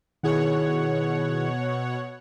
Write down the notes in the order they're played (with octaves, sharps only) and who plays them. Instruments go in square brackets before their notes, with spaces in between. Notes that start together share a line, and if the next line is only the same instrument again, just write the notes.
[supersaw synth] B2 C#5 F#5 [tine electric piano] D#3 E4 G#4